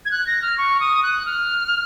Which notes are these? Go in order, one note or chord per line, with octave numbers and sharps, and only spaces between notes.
G#6
F#6
A#6
F6
C#6
D#6
F#6
F6